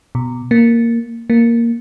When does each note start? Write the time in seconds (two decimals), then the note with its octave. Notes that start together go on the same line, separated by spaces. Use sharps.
0.15 B2
0.51 A#3
1.30 A#3